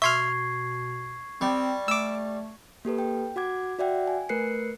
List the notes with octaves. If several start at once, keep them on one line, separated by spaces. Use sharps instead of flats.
B2 E5 C6 C#6 F6 G#6 C7
G3 C4
A3 D6 E6
A#3 G4 A4 B4
G5
F#4 F#5 D6 G#6
F#4 D5 E5 F#5 G5
G#5
A3 A#4 B4 F#6 C7 C#7